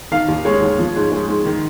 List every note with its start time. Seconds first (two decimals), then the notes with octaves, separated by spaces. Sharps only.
0.11 D#3 F5
0.28 D#2
0.45 G#3 C#5
0.62 D#2
0.79 F3
0.96 G#2
1.12 G#3
1.28 G#2
1.46 D#3